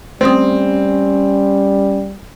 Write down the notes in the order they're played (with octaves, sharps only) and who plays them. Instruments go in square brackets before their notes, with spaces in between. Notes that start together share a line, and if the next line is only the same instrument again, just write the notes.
[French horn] G3 [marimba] A3 D#6 [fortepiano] C4 [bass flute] C#4